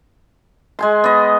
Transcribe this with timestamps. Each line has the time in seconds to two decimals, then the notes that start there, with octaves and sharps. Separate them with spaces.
0.79 G#3 G#5 C6
1.04 B3 D#5